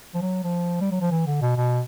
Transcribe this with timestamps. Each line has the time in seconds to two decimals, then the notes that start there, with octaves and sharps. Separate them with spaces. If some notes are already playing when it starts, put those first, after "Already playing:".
0.14 F3
0.22 F#3
0.44 F3
0.81 G3
0.91 F#3
1.01 F3
1.11 E3
1.26 D3
1.41 B2
1.57 B2